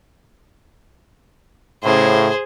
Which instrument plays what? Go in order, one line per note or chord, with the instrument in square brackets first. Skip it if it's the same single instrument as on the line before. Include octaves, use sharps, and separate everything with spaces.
[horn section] A2 C#3 [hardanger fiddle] G#4 C5